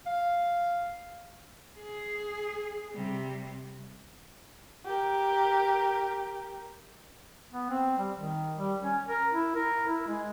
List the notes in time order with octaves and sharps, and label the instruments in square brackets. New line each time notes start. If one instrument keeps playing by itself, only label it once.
[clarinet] F5
[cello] G#4
C3 G3
[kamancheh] G4 A#4
[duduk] B3
C4
G3
D#3
G3
C#4
A#4
E4
A#4
E4
G#3